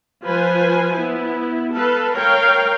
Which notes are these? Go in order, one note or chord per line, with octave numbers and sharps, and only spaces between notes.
F3 F4 B4 C5 G#5
B3 E4
A4 B4 F5
A#4 C#5 F5 G5